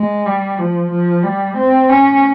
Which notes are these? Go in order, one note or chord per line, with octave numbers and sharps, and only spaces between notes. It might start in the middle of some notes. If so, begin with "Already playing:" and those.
Already playing: G#3
G3
F3
F3
G3
C4
C#4